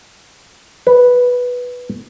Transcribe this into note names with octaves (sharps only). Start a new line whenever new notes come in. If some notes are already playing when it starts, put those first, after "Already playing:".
B4